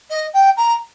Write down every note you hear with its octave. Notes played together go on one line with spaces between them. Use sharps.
D#5
G5
A#5